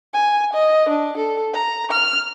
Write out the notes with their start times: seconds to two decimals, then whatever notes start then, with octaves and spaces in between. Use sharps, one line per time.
0.14 G#5
0.53 D#5
0.88 D4
1.17 A4
1.54 A#5
1.91 F6